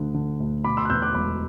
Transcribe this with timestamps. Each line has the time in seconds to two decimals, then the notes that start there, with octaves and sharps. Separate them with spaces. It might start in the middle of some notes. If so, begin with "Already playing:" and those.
Already playing: D2 D3
0.14 D3
0.40 D2
0.64 B2 B5 D6
0.77 C6 E6
0.85 F#6
0.90 E2 E6 G6
1.02 D6 F#6
1.15 E1 B5 D6